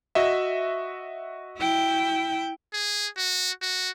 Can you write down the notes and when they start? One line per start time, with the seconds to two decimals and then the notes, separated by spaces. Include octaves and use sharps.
0.15 F#4 D#5 E5
1.58 E4 G5
2.74 G#4
3.17 F#4
3.62 F#4